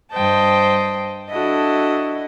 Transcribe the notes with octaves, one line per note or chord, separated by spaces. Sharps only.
G2 C5 D#5 G5 A5
D4 E4 F#4 A4 D#5